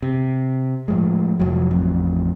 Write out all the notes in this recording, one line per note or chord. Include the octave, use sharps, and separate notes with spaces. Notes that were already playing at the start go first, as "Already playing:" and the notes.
C3
A2 F3 G#3
F1 F3 F#3
A1 F2